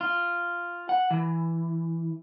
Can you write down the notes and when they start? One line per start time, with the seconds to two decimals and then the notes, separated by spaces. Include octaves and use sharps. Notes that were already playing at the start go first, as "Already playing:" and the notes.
0.01 F4
0.89 F#5
1.11 E3